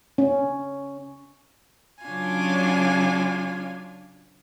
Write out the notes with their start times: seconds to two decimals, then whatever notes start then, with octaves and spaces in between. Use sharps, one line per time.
0.18 C#4
2.05 C#3 F#3 C#4 D4 F4 G#5